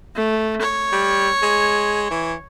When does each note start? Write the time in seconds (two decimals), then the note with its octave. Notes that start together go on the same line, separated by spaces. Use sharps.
0.15 A3
0.62 C#5
0.92 G3
1.42 G#3
2.10 E3